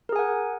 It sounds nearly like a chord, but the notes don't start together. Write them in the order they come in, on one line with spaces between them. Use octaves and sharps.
A#4 G#4 G#5 F#5